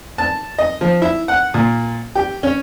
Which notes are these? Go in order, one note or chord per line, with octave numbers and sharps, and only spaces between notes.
A5
D#5
F3
E4
F#5
A#2
G4
C#4